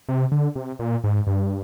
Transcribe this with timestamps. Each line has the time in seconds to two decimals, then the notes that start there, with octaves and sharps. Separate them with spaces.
0.09 C3
0.32 D3
0.56 C3
0.79 A#2
1.04 G#2
1.27 G2